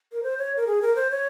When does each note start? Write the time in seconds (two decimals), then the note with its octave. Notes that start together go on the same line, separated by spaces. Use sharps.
0.13 A#4
0.23 C5
0.38 C#5
0.57 A#4
0.67 G#4
0.82 A#4
0.96 C5
1.11 C#5